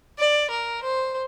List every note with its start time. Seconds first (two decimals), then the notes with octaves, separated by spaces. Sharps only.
0.19 D5
0.50 A#4
0.83 C5